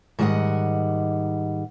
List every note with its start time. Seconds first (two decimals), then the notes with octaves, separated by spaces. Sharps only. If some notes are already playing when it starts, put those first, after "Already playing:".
0.19 G#2 D#3 G3 D#5 F#5